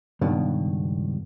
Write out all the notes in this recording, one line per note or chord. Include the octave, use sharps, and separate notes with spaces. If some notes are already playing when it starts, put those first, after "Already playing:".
C#2 G2 B2 D#3